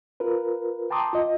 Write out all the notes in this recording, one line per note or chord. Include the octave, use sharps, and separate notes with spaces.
F4 A#4 B4
G5 A5 A#5 C6 D6 D#6
F4 D#5